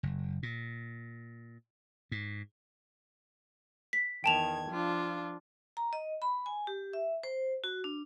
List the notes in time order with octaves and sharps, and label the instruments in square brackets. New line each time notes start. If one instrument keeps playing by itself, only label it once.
[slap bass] F#1
A#2
G#2
[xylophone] B6
[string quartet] E2 D#3 G#6 [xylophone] G5 A5 F7
[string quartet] F3 D4 F4
[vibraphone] A#5
D#5
B5
G#5
G4
E5
C5
F#4
D4